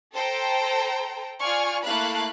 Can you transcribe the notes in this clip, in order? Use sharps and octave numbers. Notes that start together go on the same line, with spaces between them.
A4 C5 G5 A#5
F4 D5 G#5 C#6 F6
A3 A#3 E4 F5 B5 F#6